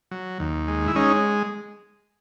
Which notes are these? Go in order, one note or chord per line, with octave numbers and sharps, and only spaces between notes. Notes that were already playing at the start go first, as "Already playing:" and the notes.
F#3
D#2
G#3
E4
G#3 C#4 D#4